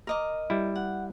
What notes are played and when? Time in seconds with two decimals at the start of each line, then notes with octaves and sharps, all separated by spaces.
0.07 A#4 D#5 D6
0.50 G3 E4
0.75 F#5